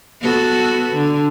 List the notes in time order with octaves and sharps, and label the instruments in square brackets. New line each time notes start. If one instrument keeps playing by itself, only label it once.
[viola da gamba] B3 F#4 A4
D3